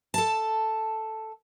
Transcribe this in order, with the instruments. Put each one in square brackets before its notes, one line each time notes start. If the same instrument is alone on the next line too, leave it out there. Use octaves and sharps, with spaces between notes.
[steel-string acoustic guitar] A4 A5